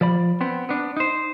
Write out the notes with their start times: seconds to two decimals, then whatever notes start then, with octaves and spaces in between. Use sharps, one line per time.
0.01 F3 D5 B5
0.41 B3 C4
0.69 B3 D4
0.97 D#4 C5